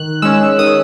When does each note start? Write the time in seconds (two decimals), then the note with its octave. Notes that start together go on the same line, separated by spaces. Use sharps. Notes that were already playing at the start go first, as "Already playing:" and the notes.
Already playing: D#3 F#6
0.22 G#3 C#4 E6
0.58 D#3 D#6